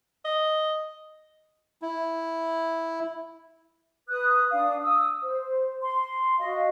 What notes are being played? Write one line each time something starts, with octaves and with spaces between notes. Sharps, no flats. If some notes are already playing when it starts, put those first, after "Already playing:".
D#5
E4
B4 D#6 F#6
D4 F5 D#6
D#6 E6
C5
C6
F#4 D#5 F5